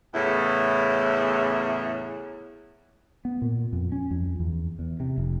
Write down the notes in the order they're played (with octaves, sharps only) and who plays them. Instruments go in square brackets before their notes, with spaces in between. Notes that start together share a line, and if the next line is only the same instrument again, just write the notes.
[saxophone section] E2 A2 C#3 E4
[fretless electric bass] B3
A#2
F2
C#4
F2
E2
E2
C3
F1